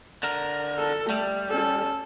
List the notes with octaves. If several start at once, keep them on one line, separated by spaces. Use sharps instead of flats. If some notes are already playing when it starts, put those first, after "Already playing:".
D3 A#4
A4
G3 A3
C#4 A4